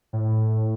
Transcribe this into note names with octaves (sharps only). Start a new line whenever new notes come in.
A2